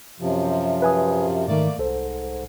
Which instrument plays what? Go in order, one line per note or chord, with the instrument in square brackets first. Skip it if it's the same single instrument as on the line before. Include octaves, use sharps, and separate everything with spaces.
[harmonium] F#2 C3 F3
[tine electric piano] B4 G#5 D#6
[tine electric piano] G#2 D#3 [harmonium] A3 A#3 D5
[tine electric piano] C2 A4 C5 [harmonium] G#2